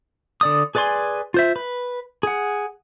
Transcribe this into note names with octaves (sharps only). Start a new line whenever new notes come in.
D3 D5 D#6
G#4 B4 D5 G#5 C6
F4 C5 E5
B4
G#4 F#5